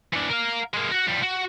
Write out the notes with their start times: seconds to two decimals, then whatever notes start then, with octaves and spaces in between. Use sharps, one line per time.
0.13 E3 D4
0.29 A#4 F5
0.74 G#3 A#3
0.91 F#4 F#5
1.07 F3 G3
1.23 F#4